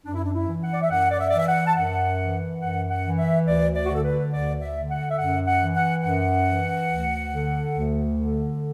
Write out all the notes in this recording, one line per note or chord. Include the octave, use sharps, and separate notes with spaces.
F#2 D4
E4
D4
E4
E3
F#5
D5
E5
F#2 F#5
D5
E5
E3 D5
E5
F#5
A5
F#2 F#5
E3
F#2 F#5
F#5
E3
E5
D2 D5
D5
F#4
D3 A4
B4
D2 D5
E5
D3
F#5
E5
F#2 F#5
F#5
E3
F#5
F#2 F#5
E3
D2
D3
D2
D3